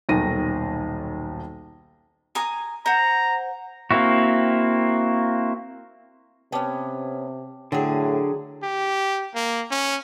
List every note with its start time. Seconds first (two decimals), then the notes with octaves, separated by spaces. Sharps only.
0.09 D#1 B1 D#3 A#6 D#7
2.35 G#5 A#5 D#6
2.86 C5 F#5 A#5
3.91 A#3 C4 E4 F#4
6.52 C3 B3 C#4 G5 A5 D6
7.72 A2 D3 F#3 G#4 F#5 G5
8.63 G4
9.35 A#3
9.71 C#4